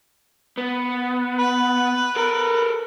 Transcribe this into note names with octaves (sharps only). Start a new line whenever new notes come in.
B3
B4
A4 A#4